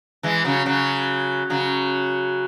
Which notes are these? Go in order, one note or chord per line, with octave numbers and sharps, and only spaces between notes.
E3 G#3
C#3 F#3
C#3 F#3
C#3 F#3